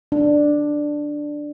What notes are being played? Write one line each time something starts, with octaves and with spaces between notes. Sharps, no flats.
D4